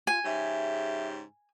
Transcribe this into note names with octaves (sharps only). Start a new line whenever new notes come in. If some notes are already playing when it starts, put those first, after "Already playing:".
F4 G#5
G#2 C#3 G4 E5